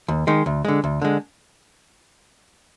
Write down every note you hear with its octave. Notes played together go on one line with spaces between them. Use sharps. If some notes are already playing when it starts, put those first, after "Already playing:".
D#2
D#3 G#3
D2
D3 G#3
D2
D3 G#3